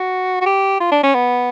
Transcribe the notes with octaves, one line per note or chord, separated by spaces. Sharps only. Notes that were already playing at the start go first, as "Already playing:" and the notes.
Already playing: F#4
F#4
G4
F4
D4
C#4
B3